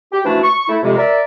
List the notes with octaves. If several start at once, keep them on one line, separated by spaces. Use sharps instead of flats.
G4
E3 F3 A3 D4 F#4
C#6
A3 E4
F2 C3 G#3
A#4 D5 E5